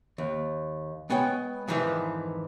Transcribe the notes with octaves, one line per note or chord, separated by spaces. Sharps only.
D#2
G#3 B3 C#5 G5
F2 G#2 D#3 E3 B4 D5